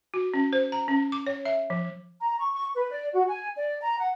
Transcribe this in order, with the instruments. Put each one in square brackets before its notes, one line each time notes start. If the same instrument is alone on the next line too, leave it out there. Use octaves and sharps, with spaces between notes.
[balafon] F#4
C#4
C5
A#5
C#4
D6
C#5
E5
F3
[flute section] A#5
C#6
C#6
B4
D5
F#4
G#5
D5
A#5
F#5